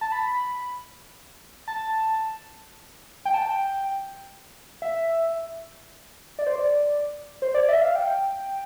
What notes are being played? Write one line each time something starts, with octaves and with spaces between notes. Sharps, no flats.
A5
B5
A5
G5
A5
G5
E5
D5
C5
D5
C5
D5
E5
F5
G5